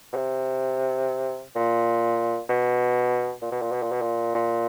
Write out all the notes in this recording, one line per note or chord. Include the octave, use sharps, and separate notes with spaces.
B2
C3
A#2
B2
A#2
B2
A#2
B2
A#2
B2
A#2
A#2